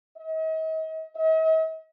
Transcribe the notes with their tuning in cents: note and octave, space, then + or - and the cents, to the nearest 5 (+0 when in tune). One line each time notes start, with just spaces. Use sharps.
D#5 +40
D#5 +45